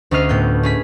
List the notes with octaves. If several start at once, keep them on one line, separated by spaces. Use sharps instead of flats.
D2 C#4 D#5 F6 C7
A2 B3 G6
C#4 G#4 B6